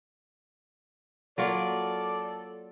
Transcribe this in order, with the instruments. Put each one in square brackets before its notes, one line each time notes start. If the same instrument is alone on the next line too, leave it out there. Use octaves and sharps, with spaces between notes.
[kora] F#3 A#3 F4 [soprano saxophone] A4 [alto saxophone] D5